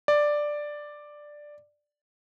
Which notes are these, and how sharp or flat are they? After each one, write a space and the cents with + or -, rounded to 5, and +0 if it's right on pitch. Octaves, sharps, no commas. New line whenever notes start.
D5 +5